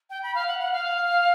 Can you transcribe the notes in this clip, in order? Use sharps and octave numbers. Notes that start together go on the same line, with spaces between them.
G5
B5
F5
F#5
F#5
F5